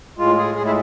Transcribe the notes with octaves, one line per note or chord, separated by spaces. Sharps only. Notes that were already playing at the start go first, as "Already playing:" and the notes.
A2 G#3 F4
G#4
A2 G#3 G#4
E4